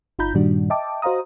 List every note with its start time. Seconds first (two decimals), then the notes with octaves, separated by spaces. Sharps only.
0.19 G1 D#4 F4 A#5 B5 G6
0.34 G2 A#2 D#3 G3 D4 F#4
0.70 D#5 E5 G5 A5 D6
1.02 F#4 C5 D#5 F5 A#5 D#6